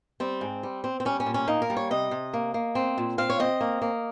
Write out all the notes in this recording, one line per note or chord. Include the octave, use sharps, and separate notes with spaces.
G3 C4
G#2
G3
C4
C4
G3 C#4
C#4
A#2
C#4
A#3 D#4
A#4
G3
C#5
C3 D#5
C3
A#3
A#3
C4
A#2
C4 F5
C#5
C4 D#5
A#3
A#3